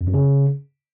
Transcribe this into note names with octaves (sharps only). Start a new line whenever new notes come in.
F2
F#2
C#3